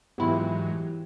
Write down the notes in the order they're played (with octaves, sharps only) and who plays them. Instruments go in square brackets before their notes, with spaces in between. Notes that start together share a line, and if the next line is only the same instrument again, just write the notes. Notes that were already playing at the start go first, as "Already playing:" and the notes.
[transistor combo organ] G#2 F#3 [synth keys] E3 G4 [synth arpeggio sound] B3 E4 F4